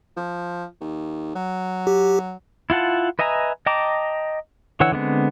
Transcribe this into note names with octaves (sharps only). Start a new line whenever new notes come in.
F3
D#2
F#3
G4
E4 F4 F#5 A5
B4 D#5 E5 G#5 A#5
D#5 G5 A5 A#5 D6
D3 E3 C#5 F#5 E6
D3 G#3 B3 C4